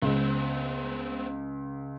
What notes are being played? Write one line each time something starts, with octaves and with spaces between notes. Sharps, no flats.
C#2 B3 C4